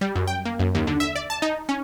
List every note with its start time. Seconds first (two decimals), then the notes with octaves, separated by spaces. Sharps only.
0.01 G3
0.16 F#2
0.27 G5
0.45 A#3
0.59 F#2
0.75 D#2
0.87 D3
1.00 E5
1.16 D5
1.30 A5
1.42 D#4
1.69 C#4